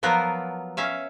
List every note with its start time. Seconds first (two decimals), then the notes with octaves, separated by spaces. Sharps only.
0.03 F3 F#3 B3 F4 F#4 A#4
0.77 C#4 E5 F5